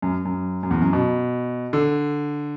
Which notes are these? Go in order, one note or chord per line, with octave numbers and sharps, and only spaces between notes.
F#2
F#2
F#2
E2
F#2
B2
D3